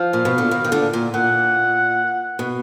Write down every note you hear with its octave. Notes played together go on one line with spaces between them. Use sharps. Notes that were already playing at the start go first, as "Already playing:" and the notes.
Already playing: F3 F5
A#2
B2
D3
B2 D#3
D#3
A#2 D3
A#2
A#2 F#5
B2